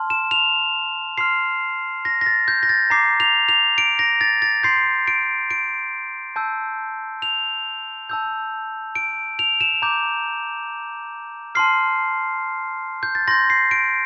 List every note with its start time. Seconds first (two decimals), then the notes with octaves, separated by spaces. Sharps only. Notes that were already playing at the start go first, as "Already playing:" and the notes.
Already playing: A5 C6 F6
0.10 E7
0.31 F7
1.18 C6 F6 C7
2.05 A#6
2.21 A#6
2.26 A6
2.48 G6
2.63 A#6
2.69 A6
2.90 A#5 D6 G6 C7
3.20 F7
3.48 F7
3.78 D7
3.99 A#6
4.21 A6
4.42 A6
4.63 C6 G6 C7
5.07 D7
5.50 D7
6.36 A5 E6 G6
7.22 F7
8.10 A5 E6 G6
8.95 D7
9.39 F7
9.61 E7
9.82 A#5 D6 G6
11.55 A5 C6 F6 C7
13.03 G6
13.15 A6
13.28 C6 G6 A#6
13.50 C7
13.71 D7